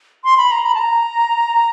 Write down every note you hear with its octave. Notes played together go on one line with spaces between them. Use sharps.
C6
B5
A#5
B5
A5
A#5